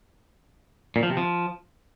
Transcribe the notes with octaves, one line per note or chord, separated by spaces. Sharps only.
A#2
F3
C3
F3